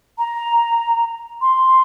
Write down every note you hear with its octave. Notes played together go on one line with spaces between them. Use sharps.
A#5
C6